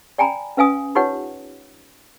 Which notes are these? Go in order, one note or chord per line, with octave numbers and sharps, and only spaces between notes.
D5 G5 G#5 A#5 B5
C#4 B4 F5 G#5 D#6
D#4 F4 G4 B4 C#5 F#5